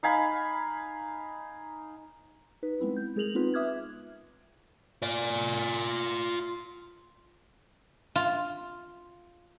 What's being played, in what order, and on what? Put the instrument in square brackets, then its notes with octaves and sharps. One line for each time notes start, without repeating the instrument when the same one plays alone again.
[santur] D#4 F5 G#5 B5
[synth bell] D#4 B4
G#3 B3 C4 E4
G6
G#3 G#4 A#4 F7 F#7
B3 C4 D#4 F4 B4
E5 D6 D#6 F6 F#6 G#6
[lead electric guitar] F4 D5
[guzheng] F4